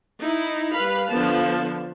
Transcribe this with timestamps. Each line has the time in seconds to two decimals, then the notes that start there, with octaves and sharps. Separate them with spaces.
0.20 D#4 E4
0.74 G3 B4 F5 B5
1.11 D3 F3 B3 A5